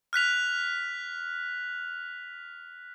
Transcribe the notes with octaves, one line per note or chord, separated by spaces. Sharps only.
F6 F#6 B6 F7